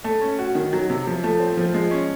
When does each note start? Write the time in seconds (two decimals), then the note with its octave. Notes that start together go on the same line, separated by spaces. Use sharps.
0.04 A3
0.21 C#4
0.39 F#4
0.55 D#3
0.73 F#3
0.90 C3
1.07 F3
1.24 A3
1.40 C4
1.57 F3
1.74 G#3
1.91 C#4